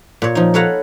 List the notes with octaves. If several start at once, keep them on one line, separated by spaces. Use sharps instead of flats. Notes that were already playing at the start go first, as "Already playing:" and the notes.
A#2 C#5
F3 D#4
A4 B4 C#5 F5 F#5 A#5